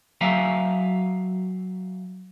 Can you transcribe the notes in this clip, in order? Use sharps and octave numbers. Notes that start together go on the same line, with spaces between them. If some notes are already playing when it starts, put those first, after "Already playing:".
F#3 E5 F5 G#5 A#5